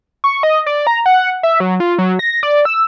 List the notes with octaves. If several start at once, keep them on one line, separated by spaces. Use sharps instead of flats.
C#6
D#5
D5
A#5
F#5
E5
F#3
F4
F#3
A#6
D5
E6